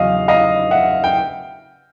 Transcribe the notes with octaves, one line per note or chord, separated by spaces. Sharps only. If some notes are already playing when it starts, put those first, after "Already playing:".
Already playing: E2 C#3 F#3 D#5 F5
D#5 F5
E5 F#5
G5